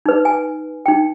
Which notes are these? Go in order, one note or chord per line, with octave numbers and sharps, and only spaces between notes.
D#4 B4
G#5
D#4 G5